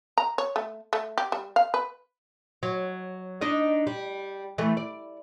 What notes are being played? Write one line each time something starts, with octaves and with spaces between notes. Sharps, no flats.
A#5
C#5
A3
A3
G4
G3
F5
B4
F#3
D4 D#4 D#5
G3
E3 A3
D5